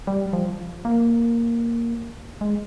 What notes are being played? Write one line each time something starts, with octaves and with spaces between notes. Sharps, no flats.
G3
F3
A#3
G#3